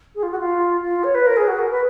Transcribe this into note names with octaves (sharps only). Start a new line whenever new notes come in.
G#4
F4
F#4
F4
F4
C#5
B4
A#4
G#4
F#4
A#4
B4